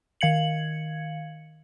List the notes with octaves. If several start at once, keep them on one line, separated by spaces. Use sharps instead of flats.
D#3 F5 G#6 C#7 F#7